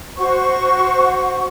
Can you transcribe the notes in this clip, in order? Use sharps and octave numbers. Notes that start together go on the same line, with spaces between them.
F#4 C5 F#5 C#6